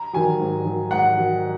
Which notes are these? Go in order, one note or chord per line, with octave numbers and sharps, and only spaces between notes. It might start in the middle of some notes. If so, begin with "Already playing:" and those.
Already playing: A#5
D#3 F#3 G#5
G#2
D#3 F#3
G#2 F#5
D#3 F#3